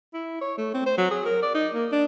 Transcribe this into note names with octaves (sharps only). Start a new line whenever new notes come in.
E4
C#5
A3
C4
C5
F#3
G#4
A#4
D5
D#4
A#3
D4